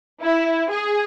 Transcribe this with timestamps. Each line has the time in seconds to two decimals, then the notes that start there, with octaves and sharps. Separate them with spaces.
0.23 E4
0.70 G#4